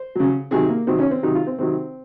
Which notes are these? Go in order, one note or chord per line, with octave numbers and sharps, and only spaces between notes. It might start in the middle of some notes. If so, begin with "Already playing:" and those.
Already playing: C5
C#3 F#3
C3 D#3 F#3 G#4
A#3
C3 D#3 F#3 C4
C#4
C4
C3 D#3 F#3 D#4
F4
C4
C3 D#3 F#3 C4